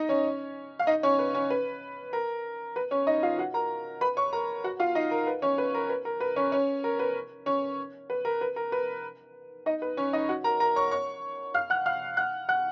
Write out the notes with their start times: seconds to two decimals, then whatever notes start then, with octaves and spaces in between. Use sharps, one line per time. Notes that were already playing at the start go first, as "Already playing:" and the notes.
Already playing: D#4 D#5
0.09 C#4 C#5
0.79 F5
0.87 D#4 D#5
1.03 C#4 C#5
1.19 B4
1.34 C#4 C#5
1.50 B4
2.13 A#4
2.76 B4
2.91 C#4 C#5
3.07 D#4 D#5
3.23 F4 F5
3.38 F#4 F#5
3.54 A#4 A#5
4.01 B4 B5
4.17 C#5 C#6
4.33 A#4 A#5
4.64 F#4 F#5
4.80 F4 F5
4.95 D#4 D#5
5.11 A#4
5.27 B4
5.42 C#4 C#5
5.58 B4
5.74 A#4
5.89 B4
6.05 A#4
6.20 B4
6.36 C#4 C#5
6.52 C#4 C#5
6.84 A#4
6.99 B4
7.46 C#4 C#5
8.10 B4
8.25 A#4
8.41 B4
8.56 A#4
8.72 B4
9.66 D#4 D#5
9.82 B4
9.97 C#4 C#5
10.13 D#4 D#5
10.29 F#4 F#5
10.44 A#4 A#5
10.60 A#4 A#5
10.76 C#5 C#6
10.91 C#5 C#6
11.54 F5 F6
11.70 F#5 F#6
11.86 F5 F6
12.17 F#5 F#6
12.49 F#5 F#6